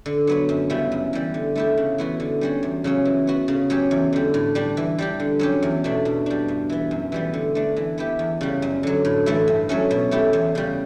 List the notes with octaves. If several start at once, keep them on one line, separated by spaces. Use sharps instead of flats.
D3
F#3 B3 F#4
F#2
C#3 G3 B3 E4
F#2
E3 G3
D3
A3 E4 G4
C#3
E3 B3 F#4
D3
G3 C#4 F#4
E2
C#3 F#3 C#4
E3
B3 F#4
C#3
F#3 C#4 G4
E2
D3 G3
A2
G3 D4
E3
G3 D4 G4
D3
F#3 C#4 G4
E2
B2 A3 D4
B2
G3 D4
G2
E3 B3
F#2
E3 G3 B3
D3
A3 D4
E3
B3 E4 G4
E2
C#3 G3
F#2
D3 F#3
A2
E3 A3 E4
G2
F#3 A3 C#4
B2
A3 E4 G4
E2
C#3 G3